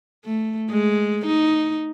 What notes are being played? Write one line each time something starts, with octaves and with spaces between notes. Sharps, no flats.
A3
G#3
D#4